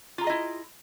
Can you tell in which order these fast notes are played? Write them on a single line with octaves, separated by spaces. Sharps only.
F4 A#5 G#4 D#5 E4